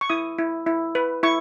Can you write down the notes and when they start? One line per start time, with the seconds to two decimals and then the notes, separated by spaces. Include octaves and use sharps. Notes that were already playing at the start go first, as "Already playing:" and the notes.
0.01 C#6
0.10 E4 D#6
0.38 E4
0.67 E4
0.95 B4
1.23 E4 C#6